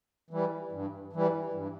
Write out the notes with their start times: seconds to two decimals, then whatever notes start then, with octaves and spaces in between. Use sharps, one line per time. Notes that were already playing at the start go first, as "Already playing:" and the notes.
0.30 E3 G3
0.72 G2
1.13 E3 G3
1.53 G2